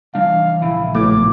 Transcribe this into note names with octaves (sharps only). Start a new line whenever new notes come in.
E3 G3 D4 F5
A#1 C#3 E4
B1 A2 D6